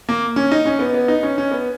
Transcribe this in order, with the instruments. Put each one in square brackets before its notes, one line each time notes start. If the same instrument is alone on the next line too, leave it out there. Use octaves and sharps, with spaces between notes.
[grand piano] A#3
C#4
D#4
C#4
B3
B3
D#4
C#4
C#4
B3